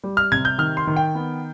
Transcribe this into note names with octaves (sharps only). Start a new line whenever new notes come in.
G3
F6
C3 G#6
G6
D#3 F6
C6
D#3
G5
B3